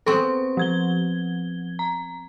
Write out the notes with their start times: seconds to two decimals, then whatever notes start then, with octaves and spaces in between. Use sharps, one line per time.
0.06 B3 C4 G#4 A4 C6 C#6
0.57 F3 G#6 G7
1.79 A#5